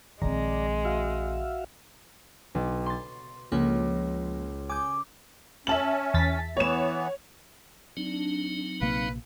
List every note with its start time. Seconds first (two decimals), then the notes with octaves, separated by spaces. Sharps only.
0.22 A#1 D#3 G#3 C4 D5 A#5
0.85 F#4 E5 F5
2.55 B1
2.86 C6 A6
3.52 C#2 F3 A#3
4.69 G#5 D6 D#6 G6
5.67 C#4 E5 A5 F#7
6.14 E2 A6 B6
6.57 E3 B3 C#5 E7
7.97 F#3 C4 D4 D#4
8.81 A#1 C3 A#3 B4 F5